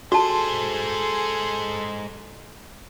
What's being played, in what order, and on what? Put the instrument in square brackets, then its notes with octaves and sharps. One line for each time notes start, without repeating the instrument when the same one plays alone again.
[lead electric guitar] G#3 C5 [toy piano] F#4 A5 [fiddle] G#4 A4